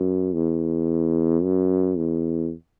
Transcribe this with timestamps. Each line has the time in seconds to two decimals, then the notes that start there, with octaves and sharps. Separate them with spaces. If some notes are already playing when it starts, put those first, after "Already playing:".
Already playing: F#2
0.34 E2
1.43 F#2
1.97 E2